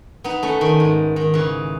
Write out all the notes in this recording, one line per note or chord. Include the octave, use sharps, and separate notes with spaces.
B3 D#4
A3 C#4
D#3
G#2
D#3
C#3 E3